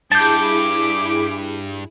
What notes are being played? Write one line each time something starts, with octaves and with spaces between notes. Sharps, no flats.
G2 E4 G4 G#4 A5 B5 D6 G6